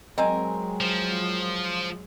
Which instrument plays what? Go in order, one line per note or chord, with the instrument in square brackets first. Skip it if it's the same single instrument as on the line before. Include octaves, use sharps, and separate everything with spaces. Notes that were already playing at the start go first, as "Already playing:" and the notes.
[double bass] F#3 G#3 [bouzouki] C4 A#4 G#5 [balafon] D#5
[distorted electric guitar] F3